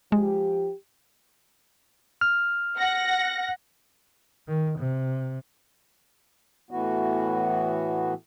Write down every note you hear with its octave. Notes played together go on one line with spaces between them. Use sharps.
F3 G#3 F4 G4
F6
F#5 A#6
D#3
C3
A2 E3 B3 F#4